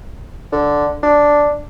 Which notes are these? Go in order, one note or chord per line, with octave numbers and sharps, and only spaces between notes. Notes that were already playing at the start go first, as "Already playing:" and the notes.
D3
D4